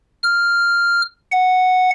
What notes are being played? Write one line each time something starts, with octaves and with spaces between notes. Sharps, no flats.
F6
F#5